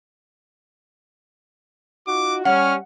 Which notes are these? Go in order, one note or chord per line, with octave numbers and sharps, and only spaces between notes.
D#4 F4 F#4 D6
G3 C#4 F#5 F6